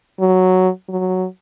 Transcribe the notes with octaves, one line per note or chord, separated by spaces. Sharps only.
F#3
F#3